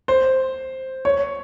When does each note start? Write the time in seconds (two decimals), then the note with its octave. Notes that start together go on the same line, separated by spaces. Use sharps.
0.08 C5
1.05 C#5